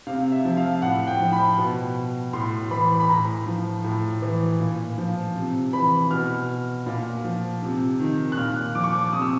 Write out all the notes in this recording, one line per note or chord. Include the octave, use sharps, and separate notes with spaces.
C3 F5
E5
F3
F5
A2 F#5
G5
F3
B5
B2
A2 C6
E3 B5
B5
A2 A#5
F3
A2
E3
A#2
F3
C3
E3 B5
B2 F6
A#2
F3
C3
D#3
F#6
A#2 F6
F3 D6
C#6
D6
C3 D#6
E6